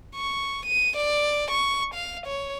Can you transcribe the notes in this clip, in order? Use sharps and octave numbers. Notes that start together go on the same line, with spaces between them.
C#6
D#7
D5
C#6
F5
C#5